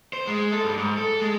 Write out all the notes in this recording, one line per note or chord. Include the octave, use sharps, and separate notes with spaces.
C5
G#3
A4
G2
G#2
A4
G#3